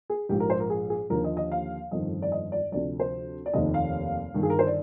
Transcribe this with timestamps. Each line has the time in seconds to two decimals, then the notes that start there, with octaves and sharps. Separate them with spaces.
0.10 G#4
0.29 A#1 G#2 F3 G4
0.40 A#4
0.50 C5
0.60 A#4
0.70 G#4
0.90 G#4
1.10 D#2 D3 F3 A#4
1.24 D#5
1.37 D#5
1.52 F5
1.91 G1 F2 D#3 D#5
2.22 D5
2.32 D#5
2.52 D5
2.72 D2 C3 F3 D5
3.00 C5
3.46 D5
3.54 F1 D#2 D#3 D#5
3.74 F5
4.34 G1 G2 D#3
4.43 G#4
4.50 A#4
4.59 C5
4.67 D5